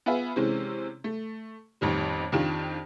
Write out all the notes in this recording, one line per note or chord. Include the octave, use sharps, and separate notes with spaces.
B3 F4 G#4 B4 E5
C3 E3 G#3 C4 C#4
A3
A1 F2 D#3 G3
F2 D#3 D4 F4 G4 E7